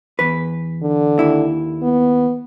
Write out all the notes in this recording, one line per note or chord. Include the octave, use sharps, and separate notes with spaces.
E2 B4
D3
D#2 E4
B3